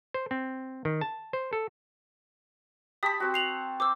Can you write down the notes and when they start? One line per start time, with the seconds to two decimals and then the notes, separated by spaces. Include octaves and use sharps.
0.14 C5
0.31 C4
0.85 D#3
1.01 A5
1.33 C5
1.53 A4
3.03 G4 A5 B5 D#6 B6
3.20 C4 F#4
3.34 C7 F7 F#7
3.80 C5 D6 E6